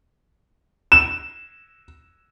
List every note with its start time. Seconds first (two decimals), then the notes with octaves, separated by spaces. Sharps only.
0.92 E7